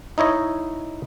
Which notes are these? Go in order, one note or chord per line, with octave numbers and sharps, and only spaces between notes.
D#4 E4 C#5 D#5